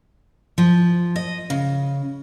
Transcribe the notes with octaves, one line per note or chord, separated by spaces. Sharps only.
F3
D#5
C#3